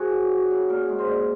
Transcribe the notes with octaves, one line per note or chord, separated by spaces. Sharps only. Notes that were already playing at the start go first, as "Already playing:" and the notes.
Already playing: F3 F#4 G#4
F#3
F#3
C#3
A#2 A#4
G#3
C5
A#2